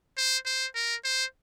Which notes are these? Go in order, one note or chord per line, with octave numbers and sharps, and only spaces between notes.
C5
C5
A#4
C5